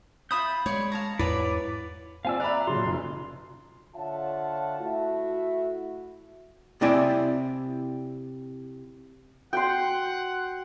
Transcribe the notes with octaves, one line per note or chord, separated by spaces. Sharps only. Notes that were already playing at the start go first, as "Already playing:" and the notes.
F4 E5 B5 D#6 G6
G#3 C#5 D5 C6
F5 A5 A#5
E2 G#2 E4 B4 C#5 D5 B5
C4 F4 D5 F5 G#5 E6
D5 E5 A#5 B5 F#6
A#2 C#3 F#3 C6
F1 F2
D3 F4 C#5 E5 F#5 A5
A3 E4 F#4 E5
C3 C4 E4 D5 G#5
F#4 F#5 G5 C6